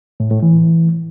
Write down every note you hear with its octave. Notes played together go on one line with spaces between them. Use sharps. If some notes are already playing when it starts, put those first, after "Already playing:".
A2
A2
E3